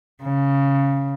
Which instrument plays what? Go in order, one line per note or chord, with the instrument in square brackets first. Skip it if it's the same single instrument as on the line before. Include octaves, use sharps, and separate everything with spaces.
[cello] C#3